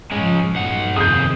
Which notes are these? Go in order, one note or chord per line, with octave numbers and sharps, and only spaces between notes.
G#2 F3 G#3 C#4
B1 G2 A#2 F#5
F2 C3 D#3 G#4 D#6 G6